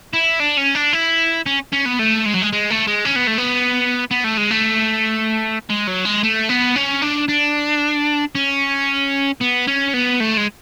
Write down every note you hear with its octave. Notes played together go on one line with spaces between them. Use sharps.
E4
D4
C#4
D4
E4
C#4
C#4
B3
A3
G#3
F#3
G#3
G#3
A3
G#3
C#4
B3
A3
B3
B3
A3
G#3
A3
G#3
F#3
G#3
A3
B3
C#4
D4
D4
C#4
B3
C#4
B3
A3
G#3